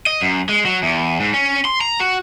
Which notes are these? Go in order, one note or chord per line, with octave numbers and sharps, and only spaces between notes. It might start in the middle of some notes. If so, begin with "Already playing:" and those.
D#5
F#2
G#3
F#3
E2
G#2
C#4
C6
A#5
F#4